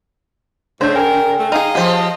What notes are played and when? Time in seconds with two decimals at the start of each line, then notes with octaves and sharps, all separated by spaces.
0.81 G#2 C#3 A3 D4 C5 C#5 G6
0.95 A#4 G5 G#5
1.39 A3
1.52 D#4 G#4 D#5 F5
1.75 F3 G4 G#4 C5